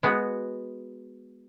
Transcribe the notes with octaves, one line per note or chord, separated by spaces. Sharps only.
G#3 B3 F#4